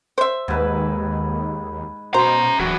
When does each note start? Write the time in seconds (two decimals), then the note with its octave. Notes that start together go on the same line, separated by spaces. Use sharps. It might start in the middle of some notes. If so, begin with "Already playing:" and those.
0.18 C5 E5
0.48 D#2 G#2 B4
2.14 B2 C#4 C5 A#5
2.59 D1 E3 F#4